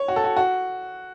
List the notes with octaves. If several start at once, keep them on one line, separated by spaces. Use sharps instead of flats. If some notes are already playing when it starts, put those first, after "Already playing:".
Already playing: C#5
F#4
A4
F#4
F#4